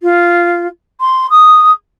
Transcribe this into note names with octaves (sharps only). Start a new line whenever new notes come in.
F4
C6
D#6